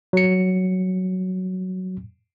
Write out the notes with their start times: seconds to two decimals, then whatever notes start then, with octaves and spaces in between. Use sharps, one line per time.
0.13 F#3 C#7